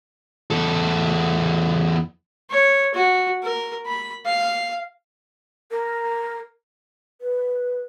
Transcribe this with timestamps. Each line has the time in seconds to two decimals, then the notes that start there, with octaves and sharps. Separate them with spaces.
0.50 E2 A4
2.50 C#5
2.94 F#4
3.42 A#4
3.86 B5
4.25 F5
5.71 A#4
7.21 B4